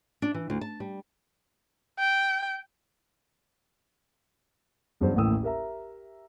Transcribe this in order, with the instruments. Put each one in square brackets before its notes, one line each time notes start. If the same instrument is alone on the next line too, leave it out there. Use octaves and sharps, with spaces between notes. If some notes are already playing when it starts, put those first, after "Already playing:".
[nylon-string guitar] D4
E3
D2
A5
G3
[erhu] G5
[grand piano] E2 G2 C#3 F#3 C5
A1 D#2 A2 G5 D#6 E6
G4 A#4 E5 A#5